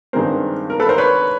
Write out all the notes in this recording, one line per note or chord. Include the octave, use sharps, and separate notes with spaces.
G2 D#3 G#3 C4 A#4 C5
A#4
A4 B4
A#4 C5
B4 C#5